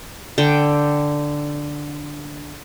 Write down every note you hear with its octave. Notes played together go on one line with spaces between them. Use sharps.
D3 G5